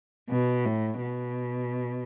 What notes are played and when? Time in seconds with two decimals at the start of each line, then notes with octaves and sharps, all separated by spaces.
0.29 B2
0.65 A2
1.01 B2